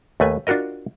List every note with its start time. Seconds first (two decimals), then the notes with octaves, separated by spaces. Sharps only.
0.20 D#2 A3 B4 G#5
0.47 D4 F4 F#4 A#4 D#5